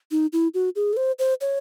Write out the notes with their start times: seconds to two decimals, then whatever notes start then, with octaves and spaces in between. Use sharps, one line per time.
0.11 D#4
0.33 E4
0.54 F#4
0.76 G#4
0.93 A4
0.97 C5
1.19 C5
1.41 C#5